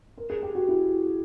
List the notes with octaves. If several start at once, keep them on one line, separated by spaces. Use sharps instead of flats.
A#4
G#4
G4
F#4
E4